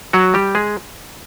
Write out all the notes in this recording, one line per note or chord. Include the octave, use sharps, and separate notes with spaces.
F#3 F#4
G3 G4
G#3 G#4